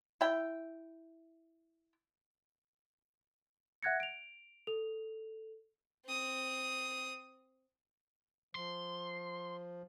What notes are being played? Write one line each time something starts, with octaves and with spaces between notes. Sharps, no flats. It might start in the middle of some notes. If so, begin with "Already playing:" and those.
E4 G5
E5 F#5 F#6 G#6 A#6 C#7
D7 F7
A4 F7
C4 D#6
F3 C6